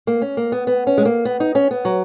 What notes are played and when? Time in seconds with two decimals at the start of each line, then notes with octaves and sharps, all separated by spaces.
0.07 A#3
0.22 C#4
0.37 A#3
0.52 B3
0.67 B3
0.87 C#4
0.98 G#3
1.05 A#3
1.25 B3
1.40 D#4
1.55 C#4
1.71 B3
1.85 F#3